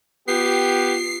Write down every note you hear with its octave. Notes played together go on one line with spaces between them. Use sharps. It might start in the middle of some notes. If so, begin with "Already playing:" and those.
B3 F4 G4 C7